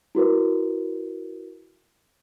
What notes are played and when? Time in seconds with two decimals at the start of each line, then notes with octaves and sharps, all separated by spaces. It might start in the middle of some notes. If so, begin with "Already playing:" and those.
0.15 E4 F#4 A#4 B4